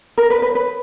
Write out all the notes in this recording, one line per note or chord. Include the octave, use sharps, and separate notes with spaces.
A#4
B4
B4
B4